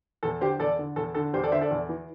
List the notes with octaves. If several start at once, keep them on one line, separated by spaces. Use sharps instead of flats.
E2 A4
D3 G4 C5
E2 A4 D5
D3
E2 A4
D3 A4
E2 G4 C5
A4 D5
D3 C5 E5
A4 D5
E2
E3